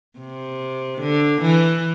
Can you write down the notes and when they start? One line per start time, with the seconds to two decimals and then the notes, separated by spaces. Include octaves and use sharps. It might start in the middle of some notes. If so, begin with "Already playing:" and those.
0.18 C3
1.01 D3
1.41 E3